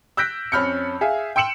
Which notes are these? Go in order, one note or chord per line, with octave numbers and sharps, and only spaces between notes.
E6 F#6 G6 A#6 B6 D7
F2 C#4 B5 F6 G6 C#7
G#4 E5 F5 G#5
G5 C6 E6 C#7 E7 F#7